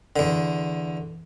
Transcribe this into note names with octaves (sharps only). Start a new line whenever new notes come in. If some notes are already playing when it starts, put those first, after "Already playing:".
E2 D3